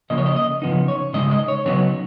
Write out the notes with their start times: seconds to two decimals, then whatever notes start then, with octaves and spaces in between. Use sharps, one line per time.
0.10 C#3 F3 A#3 D#5
0.18 C#5
0.26 D#5
0.36 D#5
0.62 C#3 F3 B3 D#4
0.88 C#5
1.13 C#3 G#3 D#4 D#5
1.31 D#5
1.48 C#5
1.65 C#3 F#3 B3 D#4 C#5